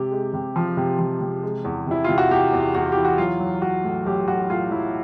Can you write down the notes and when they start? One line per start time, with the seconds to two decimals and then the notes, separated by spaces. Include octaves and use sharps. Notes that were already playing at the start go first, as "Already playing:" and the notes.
Already playing: C3 G#3 G4
0.11 G#3
0.33 C3
0.56 F3
0.77 C3
0.99 F3
1.21 C3
1.43 G#3
1.64 E2
1.87 C3 E4
2.04 C3 F4
2.18 F#4
2.31 E2 G4
2.53 E2
2.75 E2 F#4
2.92 E3 G4
3.05 F#4
3.18 F#3 F4
3.40 F#3
3.62 F#3 F#4
3.84 A2
4.06 B1 G4
4.28 B1 F#4
4.50 A2 F4
4.71 F#3 E4